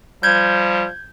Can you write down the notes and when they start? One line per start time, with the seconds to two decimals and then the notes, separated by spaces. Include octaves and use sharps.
0.23 F3 G3 G6 G#6